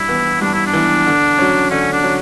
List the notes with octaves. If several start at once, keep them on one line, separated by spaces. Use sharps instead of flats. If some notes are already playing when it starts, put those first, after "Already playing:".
Already playing: G2 E4
E3 B3
G2 D4
E4
D4
E3 B3
D3
F#3 C#4
D3 C#4
D4
F#3 C#4